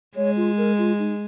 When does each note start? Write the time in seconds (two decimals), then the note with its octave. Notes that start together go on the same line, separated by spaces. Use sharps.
0.16 G#3 C#5
0.37 F4
0.58 A#4
0.78 F4
0.99 D#4